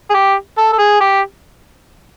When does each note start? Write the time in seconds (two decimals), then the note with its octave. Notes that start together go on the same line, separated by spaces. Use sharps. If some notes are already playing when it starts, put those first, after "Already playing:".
0.10 G#4
0.14 G4
0.58 A4
0.73 A4
0.79 G#4
1.00 G4